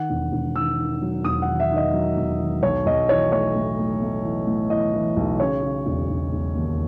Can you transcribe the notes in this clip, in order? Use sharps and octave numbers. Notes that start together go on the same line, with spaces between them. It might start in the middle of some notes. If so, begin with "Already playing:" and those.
Already playing: D#3 F#5
E1
E1
D#3 E6
D#3
F#3
E1 D#6
F#5
D#3
E5
D#3
D#5
F#3
E1
D#3
B1 C#5
B1 D#5
E3 C#5
A3 C#5
A2
A3
A3
E3
A2
E3 D#5
E3
B1
C#3 C#5
C#3
E1
E1
E1
D#2